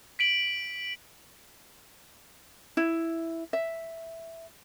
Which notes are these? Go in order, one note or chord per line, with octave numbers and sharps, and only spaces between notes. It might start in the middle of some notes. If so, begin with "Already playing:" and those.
B6 D7 F#7
E4
E5